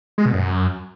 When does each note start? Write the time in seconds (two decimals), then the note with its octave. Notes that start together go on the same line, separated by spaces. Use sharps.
0.18 G#3
0.26 B2
0.33 F#2